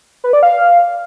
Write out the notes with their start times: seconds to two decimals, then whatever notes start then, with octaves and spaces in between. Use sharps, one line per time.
0.24 B4
0.33 D5
0.43 F5